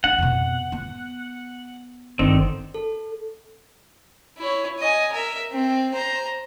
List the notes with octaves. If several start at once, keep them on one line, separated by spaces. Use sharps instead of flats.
D4 F#5
F2 B2
B3
G1 D3 D#3 C4
A4
E4 C#5
D#5 G#5
A#4 E5
C4
C5 A#5